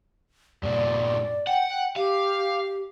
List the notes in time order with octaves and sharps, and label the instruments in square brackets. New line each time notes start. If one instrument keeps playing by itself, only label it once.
[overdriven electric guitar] G2 A#2 [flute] D5
[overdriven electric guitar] F#5 [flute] G5
[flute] G4 [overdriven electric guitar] F5